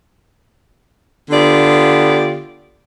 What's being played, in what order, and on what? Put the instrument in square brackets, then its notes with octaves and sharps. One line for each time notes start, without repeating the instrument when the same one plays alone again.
[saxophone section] D3 B3 F4 G4 D5